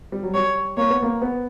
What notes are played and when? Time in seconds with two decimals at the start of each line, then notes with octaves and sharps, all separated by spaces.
0.12 G3
0.23 F#3
0.34 G3 C#5
0.77 A#3 C#5
0.90 B3
1.03 A#3
1.22 B3